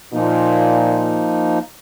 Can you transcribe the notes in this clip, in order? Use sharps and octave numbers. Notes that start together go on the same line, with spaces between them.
A#2 F3 A#3 D#4